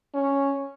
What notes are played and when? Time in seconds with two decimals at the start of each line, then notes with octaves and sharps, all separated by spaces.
0.14 C#4